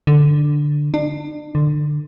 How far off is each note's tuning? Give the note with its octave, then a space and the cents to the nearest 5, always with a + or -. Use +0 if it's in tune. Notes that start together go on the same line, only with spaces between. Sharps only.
D3 +5
D4 +35
D3 +20